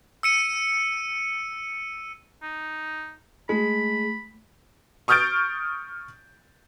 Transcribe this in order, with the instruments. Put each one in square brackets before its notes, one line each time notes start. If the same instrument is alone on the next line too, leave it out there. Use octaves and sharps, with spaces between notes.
[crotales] E6 C#7 D#7
[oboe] D#4
[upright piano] G#3 [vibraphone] A3 [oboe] B5
[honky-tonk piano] C#6 D#6 F6 G6 A6 D7